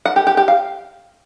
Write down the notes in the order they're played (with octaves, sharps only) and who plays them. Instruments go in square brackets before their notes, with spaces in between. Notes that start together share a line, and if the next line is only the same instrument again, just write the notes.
[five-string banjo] F#5
G4
G4
G4
F5